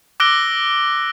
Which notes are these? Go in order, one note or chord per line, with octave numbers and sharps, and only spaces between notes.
D6 E6 F#6 A#6 D7 G7